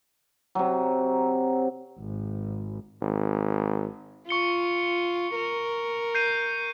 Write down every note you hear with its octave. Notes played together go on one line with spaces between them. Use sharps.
C3 F#3
G#1
G#1
F4 C#6 C#7 G7
A#4
G6 C7 D#7